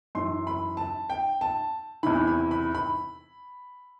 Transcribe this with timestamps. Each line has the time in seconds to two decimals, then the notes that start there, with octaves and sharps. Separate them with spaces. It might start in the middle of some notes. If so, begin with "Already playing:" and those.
0.15 F#2 E3 C6
0.47 B5
0.77 A5
1.10 G5
1.41 A5
2.03 E2 C3 E3 B5
2.27 B5
2.51 B5
2.75 B5